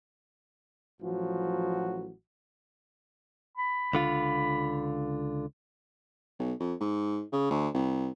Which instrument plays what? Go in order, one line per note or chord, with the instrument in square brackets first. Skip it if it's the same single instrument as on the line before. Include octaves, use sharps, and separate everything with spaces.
[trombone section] A1 F3 F#3 F#4
[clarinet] B5
[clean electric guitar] C#2 D3 F4
[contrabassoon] B1
F2
G#2
C#3
D2
C2